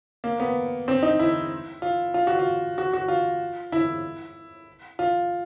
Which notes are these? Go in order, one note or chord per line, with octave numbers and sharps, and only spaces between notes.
A#3
B3
C4
D#4
E4
F4
F4
F#4
F4
F#4
F#4
F4
E4
F4